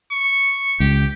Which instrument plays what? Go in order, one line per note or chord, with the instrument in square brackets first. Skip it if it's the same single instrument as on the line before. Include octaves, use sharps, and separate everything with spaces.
[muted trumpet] C#6
[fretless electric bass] C#2 [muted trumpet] G4